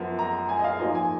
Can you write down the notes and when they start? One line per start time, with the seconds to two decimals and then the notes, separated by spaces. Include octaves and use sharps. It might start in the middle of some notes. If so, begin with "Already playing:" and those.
Already playing: F#2 F3 B3
0.19 A#5
0.49 G#5
0.59 D#5
0.64 F5
0.79 G#2 F3 A#3 D#5
0.95 G#5